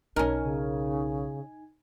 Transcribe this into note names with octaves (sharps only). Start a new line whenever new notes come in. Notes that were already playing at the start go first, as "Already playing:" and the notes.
B1 C#4 D#4 A#4 G#5
C#3